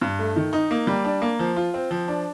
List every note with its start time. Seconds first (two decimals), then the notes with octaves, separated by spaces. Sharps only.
0.02 G2
0.19 A3
0.36 D#3
0.53 D#4
0.71 A#3
0.87 G3
1.05 D4
1.22 A#3
1.39 F3
1.56 F4
1.74 C4
1.91 F3
2.08 D4